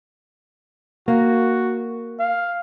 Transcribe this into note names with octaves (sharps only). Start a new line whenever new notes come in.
A#3 F#4
F5